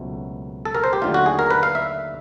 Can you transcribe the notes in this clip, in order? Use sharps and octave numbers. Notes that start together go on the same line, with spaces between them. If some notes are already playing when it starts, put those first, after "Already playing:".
Already playing: C#2 B2 F#3 A3 C4
A4
A#4
C5
G4
D#2 D3 F#3 A3 F4
F#4
G#4
A#4
B4
F5
E5